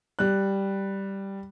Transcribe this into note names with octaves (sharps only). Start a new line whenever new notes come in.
G3 F#6